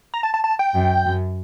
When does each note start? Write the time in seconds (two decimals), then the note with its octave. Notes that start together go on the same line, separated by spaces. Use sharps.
0.14 A#5
0.23 A5
0.34 A5
0.44 A5
0.59 G5
0.74 F#2
1.06 F#2